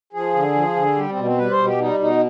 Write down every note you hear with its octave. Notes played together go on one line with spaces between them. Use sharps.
F3 G#4
D3
F3
D3
G3 G4
C4
B2
C4
G3 B4
C5
B2
G4
G3 D#4
B2 D#4